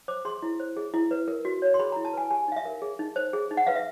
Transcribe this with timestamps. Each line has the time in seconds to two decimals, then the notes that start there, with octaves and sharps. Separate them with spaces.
0.08 C5 D6
0.25 G#4 C6
0.43 E4
0.60 C5
0.77 G#4
0.94 E4
1.11 B4
1.28 A#4
1.45 F#4
1.62 C#5
1.74 C6
1.79 G#4 B5
1.92 E4 A#5
2.05 A5
2.13 B4 G#5
2.31 G4 G#5
2.48 D#4 F5
2.56 E5
2.65 A#4
2.82 G#4
2.99 D#4
3.16 C5
3.33 G#4
3.51 D#4
3.57 F#5
3.67 B4 F5
3.75 E5